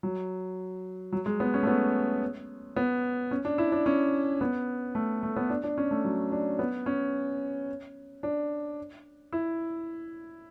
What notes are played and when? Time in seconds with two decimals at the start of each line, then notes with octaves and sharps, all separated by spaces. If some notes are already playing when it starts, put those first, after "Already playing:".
0.03 F#3
1.12 F#3
1.26 G#3
1.40 B3
1.54 C#4
1.63 A3
1.67 B3
2.76 B3
3.31 C#4
3.45 D4
3.58 E4
3.72 D4
3.86 C#4
4.41 B3
4.95 A3
5.23 A3
5.36 B3
5.50 D4
5.64 D4
5.78 C#4
5.91 A3
6.05 F#3
6.32 D4
6.59 B3
6.86 C#4
8.23 D4
9.32 E4